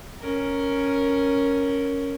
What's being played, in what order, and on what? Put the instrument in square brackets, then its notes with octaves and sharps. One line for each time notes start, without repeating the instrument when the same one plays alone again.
[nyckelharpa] C#4 A#4